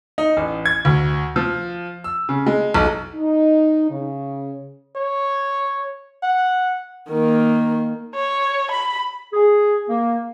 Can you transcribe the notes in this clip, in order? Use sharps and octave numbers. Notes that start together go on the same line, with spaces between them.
D#4
A1
G#6
D2
F3
E6
C#3
G#3
B1
D#4
C#3
C#5
F#5
D#3 A#3
C#5
B5
G#4
A#3